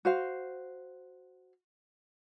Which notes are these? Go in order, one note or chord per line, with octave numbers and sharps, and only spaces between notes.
F#4 C5 F5